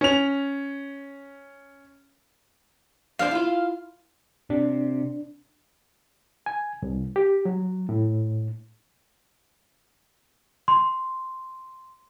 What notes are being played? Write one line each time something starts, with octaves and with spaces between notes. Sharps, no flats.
C#4 F7
F2 D4 C5 F5
E4 F4
C3 D4
G#5
C2
G4
F#3
A2
C6